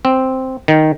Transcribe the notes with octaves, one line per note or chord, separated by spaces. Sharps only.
C4
D#3